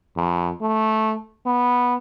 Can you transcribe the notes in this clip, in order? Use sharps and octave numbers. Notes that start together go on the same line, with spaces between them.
F2
A3
B3